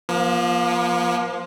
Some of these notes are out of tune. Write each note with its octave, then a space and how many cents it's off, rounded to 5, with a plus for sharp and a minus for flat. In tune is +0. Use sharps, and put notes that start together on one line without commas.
F3 +0 A#3 +40